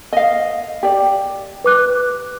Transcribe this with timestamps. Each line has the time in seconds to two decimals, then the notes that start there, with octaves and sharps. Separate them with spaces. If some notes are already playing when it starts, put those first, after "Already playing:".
0.13 D#5 F5
0.83 G4 D5 G5
1.64 B4 D6 F#6